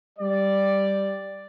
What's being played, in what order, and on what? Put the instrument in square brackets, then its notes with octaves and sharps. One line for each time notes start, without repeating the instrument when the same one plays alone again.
[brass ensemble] G3 D5